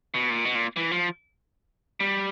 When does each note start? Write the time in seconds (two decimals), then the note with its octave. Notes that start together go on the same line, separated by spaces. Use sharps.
0.14 B2
0.30 A#2
0.45 B2
0.55 A#2
0.77 E3
0.91 F3
2.00 G3